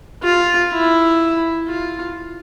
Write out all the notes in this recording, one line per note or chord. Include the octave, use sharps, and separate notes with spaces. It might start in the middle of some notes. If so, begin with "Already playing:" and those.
F4
E4
F4